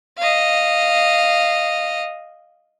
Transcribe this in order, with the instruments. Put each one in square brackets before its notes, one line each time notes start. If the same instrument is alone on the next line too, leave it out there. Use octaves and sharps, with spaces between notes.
[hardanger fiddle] D#5 F5